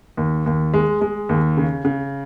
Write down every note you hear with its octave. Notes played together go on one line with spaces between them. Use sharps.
D#2
D#2
G#3
G#3
D#2
C#3
C#3